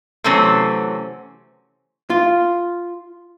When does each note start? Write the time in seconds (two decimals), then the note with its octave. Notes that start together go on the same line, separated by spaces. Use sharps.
0.24 C3 E3 F#3 A3 C4 C#4
2.10 F4